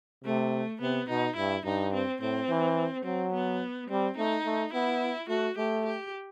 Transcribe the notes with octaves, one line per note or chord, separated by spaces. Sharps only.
C3 A3
C3 B3
B2 D#4
G2 E4
G2 D#4
C4
A2 C4
E3
F#3 C4
B3
G3 C4
A3 D#4
A3
B3 E4
A3 F#4
A3 G4
G4